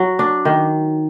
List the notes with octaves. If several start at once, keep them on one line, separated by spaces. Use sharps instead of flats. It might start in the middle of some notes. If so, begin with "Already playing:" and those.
Already playing: F#3
D4
D#3